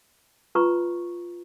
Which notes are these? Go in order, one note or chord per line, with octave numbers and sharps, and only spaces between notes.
F4 B4 A#5 C#6